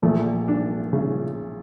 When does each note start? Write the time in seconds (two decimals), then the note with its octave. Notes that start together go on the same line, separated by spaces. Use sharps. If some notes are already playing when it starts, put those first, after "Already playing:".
0.02 A#1 A#2 A3
0.48 D4
0.93 C#3